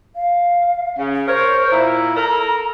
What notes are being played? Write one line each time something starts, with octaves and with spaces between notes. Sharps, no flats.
F5
C#3
A#4 C5 C#5
A#2 E4 A#5
A4 A#4